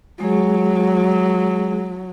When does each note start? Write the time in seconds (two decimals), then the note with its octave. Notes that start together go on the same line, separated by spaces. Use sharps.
0.21 F#3 G#3 G#4